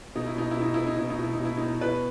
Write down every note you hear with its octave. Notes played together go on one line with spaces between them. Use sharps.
B2 D#4
E4
B2 D#4
B2 E4
D#4
B2 E4
D#4
B2 E4
D#4
B2 E4
D#4
B2 E4
B2 D#4
B2 B4